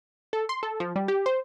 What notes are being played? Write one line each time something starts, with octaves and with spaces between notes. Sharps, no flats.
A4
C6
A4
F3
G3
G4
C5